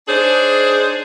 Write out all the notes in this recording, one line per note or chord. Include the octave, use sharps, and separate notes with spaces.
D4 D#4 G#4 C5 C#5